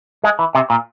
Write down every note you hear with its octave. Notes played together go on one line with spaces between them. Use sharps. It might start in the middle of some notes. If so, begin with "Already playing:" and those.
G#3
E3
C3
A#2